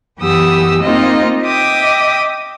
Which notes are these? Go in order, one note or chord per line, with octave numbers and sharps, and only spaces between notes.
F#2 E3 B3 G4 D#6 E6
A#3 C4 D#4 F4 D#5
D#5 E5 G5 D6 D#6